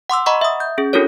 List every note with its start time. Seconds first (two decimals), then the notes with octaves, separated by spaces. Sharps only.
0.10 F#5 C6 D6 E6
0.26 D#5 F#5 A#5 B5 C#6
0.41 E5 D#6
0.60 G6
0.78 C#4 G#4
0.93 D4 E4 F#4 A4 A#4 C#5